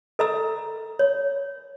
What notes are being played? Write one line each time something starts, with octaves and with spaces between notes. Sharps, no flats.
A4 D#5 A#5 E6
C#5